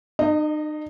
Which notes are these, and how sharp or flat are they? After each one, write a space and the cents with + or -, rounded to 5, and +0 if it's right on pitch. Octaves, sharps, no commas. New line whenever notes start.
D#4 -40 D#5 -5